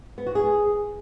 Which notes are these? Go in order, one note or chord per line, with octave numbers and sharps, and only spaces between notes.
B3
F#4
G#4